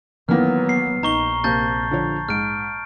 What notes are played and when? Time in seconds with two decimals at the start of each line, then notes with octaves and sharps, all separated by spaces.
0.29 D#3 E3 F#3 A#3 B3 F6
0.69 C7
1.03 A#1 D#4 A#5 C#6 G7
1.44 C3 A#3 C4 A5 G6 A6
1.91 D3 F3 C#5
2.29 G#2 F6 D7